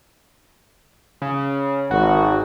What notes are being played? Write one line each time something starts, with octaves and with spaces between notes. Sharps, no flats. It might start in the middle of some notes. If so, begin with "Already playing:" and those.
C#3
G#1 F#4